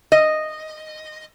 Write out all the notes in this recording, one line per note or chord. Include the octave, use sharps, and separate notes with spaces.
D#5